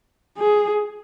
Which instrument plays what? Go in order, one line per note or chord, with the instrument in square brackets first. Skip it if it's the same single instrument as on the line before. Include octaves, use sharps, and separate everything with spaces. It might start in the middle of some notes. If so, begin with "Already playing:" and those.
[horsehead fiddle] G#4